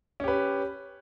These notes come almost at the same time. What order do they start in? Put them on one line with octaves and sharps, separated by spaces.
C#4 G4 B4